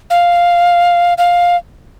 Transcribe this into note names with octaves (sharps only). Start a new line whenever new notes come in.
F5
F5